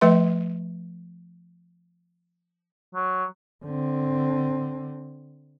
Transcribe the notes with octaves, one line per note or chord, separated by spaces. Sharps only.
F3 A3 B4 E5 C6
F#3
D3 C4